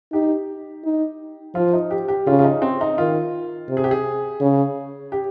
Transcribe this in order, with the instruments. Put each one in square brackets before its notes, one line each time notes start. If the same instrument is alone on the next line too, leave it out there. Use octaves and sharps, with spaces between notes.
[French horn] D#4 [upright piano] G4
[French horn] D#4
[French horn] F3 [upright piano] F4
[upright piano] D#4
G4
G4
[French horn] C#3 [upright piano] F4
[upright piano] F4
D#4
C4
D#4
[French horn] D#3 [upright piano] F4
[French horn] C3
[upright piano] G#4
G4
G#4
[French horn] C#3
[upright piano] G4